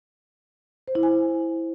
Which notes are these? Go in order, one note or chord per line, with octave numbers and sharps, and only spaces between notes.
C5
E4
G#5